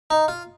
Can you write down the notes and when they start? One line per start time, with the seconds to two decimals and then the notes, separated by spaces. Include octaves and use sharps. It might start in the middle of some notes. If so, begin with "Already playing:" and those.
0.10 D#4
0.28 F4